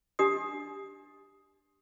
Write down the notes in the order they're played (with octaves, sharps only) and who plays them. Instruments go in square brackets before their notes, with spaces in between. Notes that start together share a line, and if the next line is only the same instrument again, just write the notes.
[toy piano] D4 G4 D#5 D#6